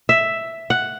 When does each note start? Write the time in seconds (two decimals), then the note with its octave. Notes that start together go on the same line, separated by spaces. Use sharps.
0.09 E5
0.70 F#5